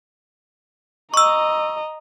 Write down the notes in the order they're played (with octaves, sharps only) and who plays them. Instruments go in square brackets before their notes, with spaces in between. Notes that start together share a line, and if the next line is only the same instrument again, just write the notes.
[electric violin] D#5 A#5 [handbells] C#6 E6